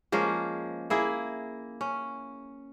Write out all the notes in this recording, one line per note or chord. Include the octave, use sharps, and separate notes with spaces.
F3 G#3 A#3 C#4
A#3 E4 G#4
C#4